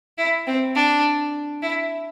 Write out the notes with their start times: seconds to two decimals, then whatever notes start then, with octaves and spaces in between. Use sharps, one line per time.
0.18 E4
0.47 C4
0.75 D4
1.62 E4